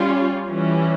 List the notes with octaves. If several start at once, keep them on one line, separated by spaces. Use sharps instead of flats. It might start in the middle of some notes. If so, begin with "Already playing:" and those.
Already playing: G3 C#4 F4
E3 G3 C#4